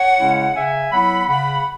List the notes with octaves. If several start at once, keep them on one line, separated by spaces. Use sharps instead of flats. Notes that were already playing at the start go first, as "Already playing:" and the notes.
Already playing: C#5 F#5
C#3 G#3 C#4 E4
C#3 E5 G#5
F#3 B3 E4 F#5 B5
C#3 F#5 B5